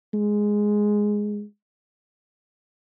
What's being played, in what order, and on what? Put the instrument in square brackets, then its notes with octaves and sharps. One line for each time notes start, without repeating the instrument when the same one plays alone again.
[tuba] G#3